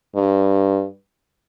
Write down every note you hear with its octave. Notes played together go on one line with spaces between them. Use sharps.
G2